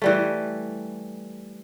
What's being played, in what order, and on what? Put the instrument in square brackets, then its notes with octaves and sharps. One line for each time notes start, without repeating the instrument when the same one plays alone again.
[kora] E3 G3 A3